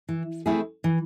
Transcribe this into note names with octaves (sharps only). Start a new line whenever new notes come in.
E3
A3 C4 E4 G#4
E3